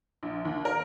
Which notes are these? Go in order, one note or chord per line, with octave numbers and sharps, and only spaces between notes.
A#1
D#2
A#4